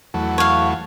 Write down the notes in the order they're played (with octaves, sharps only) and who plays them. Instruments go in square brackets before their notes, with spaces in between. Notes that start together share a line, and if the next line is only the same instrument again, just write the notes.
[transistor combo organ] E2 F#3 A3
[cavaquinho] C#5 F5